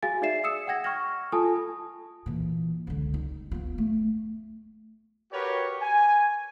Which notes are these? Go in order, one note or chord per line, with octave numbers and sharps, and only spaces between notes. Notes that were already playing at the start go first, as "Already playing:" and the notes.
F#4 G#4 F5 G#5 A6
D#4 G#4 D5 E5 C7 E7
D#6 E6 C#7 E7
F#5 G5 G#6 A#6
C#6 F6 A#6
F4 A4 G#5 A5 D#6
A#2 E3
C#2 D3
D#4
B3 F4
A3
F#4 G4 A#4 B4 C#5
G#5